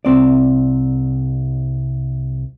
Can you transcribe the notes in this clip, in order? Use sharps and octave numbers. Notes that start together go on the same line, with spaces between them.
C2 C4 D5